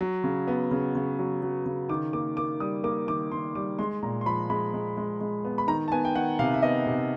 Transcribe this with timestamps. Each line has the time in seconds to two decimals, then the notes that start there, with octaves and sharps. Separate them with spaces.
0.01 F#3
0.24 C#3
0.48 B3
0.71 C#3
0.95 C#3
1.19 F#3
1.42 F#3
1.66 C#3
1.89 D#3 D6
2.13 A#3 D6
2.37 A#3 D6
2.60 G3 D#6
2.84 A#3 D6
3.08 D#3 D6
3.32 D#3 C6
3.55 G3 D6
3.79 G#3 C6
4.03 A#2 A#5
4.21 C6
4.26 F3 B5
4.50 G#3 B5
4.74 G#3
4.97 G#3
5.21 G#3
5.45 B3
5.58 B5
5.68 D#3 A#5
5.88 A5
5.92 B3 G#5
6.05 G5
6.15 D#3 F#5
6.39 C3 F5
6.54 E5
6.62 B3 D#5
6.86 C3